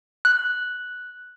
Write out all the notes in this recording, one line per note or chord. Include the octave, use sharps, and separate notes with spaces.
F#6